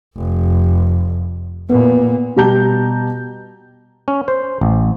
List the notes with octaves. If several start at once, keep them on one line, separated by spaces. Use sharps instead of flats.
F1
A#2 B3
B2 G3 G4 A5 A#5 G6
C#4
C5
A1